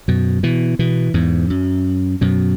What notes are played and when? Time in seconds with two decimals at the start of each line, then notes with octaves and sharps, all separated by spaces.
0.08 F#2 B2
0.43 B2 E3
0.79 B2 E3
1.14 E2 G#2
1.50 F#2
2.21 F#2 B2